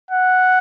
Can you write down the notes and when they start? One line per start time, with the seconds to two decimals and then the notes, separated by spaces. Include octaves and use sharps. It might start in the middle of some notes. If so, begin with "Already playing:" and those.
0.11 F#5